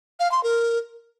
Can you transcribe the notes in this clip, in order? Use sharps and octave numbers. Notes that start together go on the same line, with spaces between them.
F5
C6
A#4